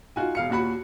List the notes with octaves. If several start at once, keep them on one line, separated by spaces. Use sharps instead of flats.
D#4 F4 F#4 G#5
E1 F5 C#7
D#2 A#2 F#4 B5 C#7